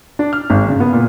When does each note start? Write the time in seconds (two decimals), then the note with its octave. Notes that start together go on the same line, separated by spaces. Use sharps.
0.19 D4
0.33 F6
0.50 G#1
0.68 C#3
0.80 B3
0.93 A#2